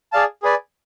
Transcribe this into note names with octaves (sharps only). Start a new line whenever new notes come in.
G#4 D5 F5 A5
G#4 B4 D5 G#5